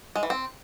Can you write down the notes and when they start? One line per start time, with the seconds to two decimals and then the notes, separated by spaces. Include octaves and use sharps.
0.15 G#3
0.23 E3
0.30 C4